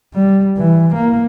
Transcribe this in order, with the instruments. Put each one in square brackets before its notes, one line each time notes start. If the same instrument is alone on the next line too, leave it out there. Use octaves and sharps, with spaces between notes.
[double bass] G3
E3
A#3